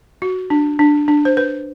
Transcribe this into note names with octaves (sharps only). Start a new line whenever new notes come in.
F#4
D4
D4
D4
C5
B4